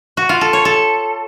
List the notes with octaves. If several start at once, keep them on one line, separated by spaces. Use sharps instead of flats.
F#4
F4
A4
C#5
A4